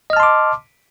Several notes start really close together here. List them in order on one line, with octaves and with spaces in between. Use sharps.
D#5 F6 A5 C6 D6